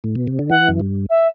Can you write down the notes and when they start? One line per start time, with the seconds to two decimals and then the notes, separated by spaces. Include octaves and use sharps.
0.04 A2
0.15 B2
0.27 C3
0.39 D3
0.50 E3 F#5
0.69 F#2
0.80 G2
1.09 E5